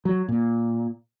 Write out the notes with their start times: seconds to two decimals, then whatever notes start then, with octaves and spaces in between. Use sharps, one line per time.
0.05 F#3
0.28 A#2